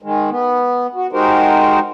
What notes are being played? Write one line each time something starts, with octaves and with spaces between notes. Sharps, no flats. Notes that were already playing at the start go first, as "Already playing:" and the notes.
D#3 G#3
B3
F#4
G#3 D#4 F#4 G4 A#4 C5